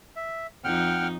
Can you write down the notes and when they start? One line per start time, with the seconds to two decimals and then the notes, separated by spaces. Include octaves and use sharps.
0.16 E5
0.64 F2 D#4 F#5 G5 F6